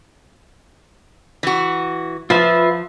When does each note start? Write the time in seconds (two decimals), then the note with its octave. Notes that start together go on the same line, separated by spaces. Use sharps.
1.43 E3 F#4
2.30 F3 F4 B4 E5